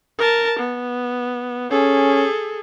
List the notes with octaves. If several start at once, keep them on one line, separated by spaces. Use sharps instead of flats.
A#4 A5
B3
C#4 G#4 A4